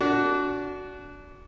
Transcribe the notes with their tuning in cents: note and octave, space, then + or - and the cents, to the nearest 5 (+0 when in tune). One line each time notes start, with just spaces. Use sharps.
D4 -25 F#4 +5